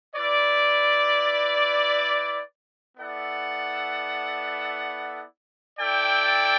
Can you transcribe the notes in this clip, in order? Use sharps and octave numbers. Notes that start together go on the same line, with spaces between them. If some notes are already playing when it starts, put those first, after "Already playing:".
E4 B4 D5
B3 E4 A4 D5 F#5
E4 A4 D5 G5